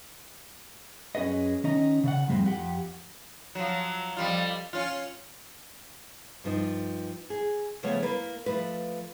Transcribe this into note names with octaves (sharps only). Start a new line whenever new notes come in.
F#2 C#4 G#4 B4 D#5
D#3 C#4 D#5 A#5
C#3 D5 F#5
F2 A2 G3 G#3 C4
F2 G4 F#5
F3 F#3
F2 G3 F4
C#4 F4
G2 F3 D#4
G#4
C#3 F3 A3 B3 C#5
A#3 E4 A#4 B4
F3 A3 B4